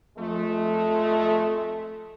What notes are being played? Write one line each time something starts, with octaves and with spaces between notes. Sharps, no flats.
F2 F3 G#3 A3